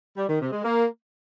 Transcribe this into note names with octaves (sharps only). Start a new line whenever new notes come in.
G3
D#3
C3
G#3
A#3